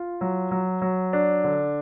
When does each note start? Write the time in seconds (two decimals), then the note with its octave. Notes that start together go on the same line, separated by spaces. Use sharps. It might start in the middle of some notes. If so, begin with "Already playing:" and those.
Already playing: F4
0.21 F#3
0.51 F#3
0.82 F#3
1.13 D4
1.44 D3